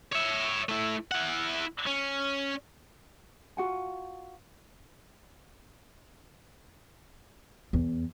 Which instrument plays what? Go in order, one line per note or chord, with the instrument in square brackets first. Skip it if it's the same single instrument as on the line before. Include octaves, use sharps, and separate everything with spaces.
[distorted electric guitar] C#5 E5
A3 E4
E4 F#5
C#4
[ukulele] F4 F#4 F#5 G#5
[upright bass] E2